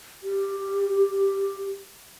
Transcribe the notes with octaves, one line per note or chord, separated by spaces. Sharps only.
G4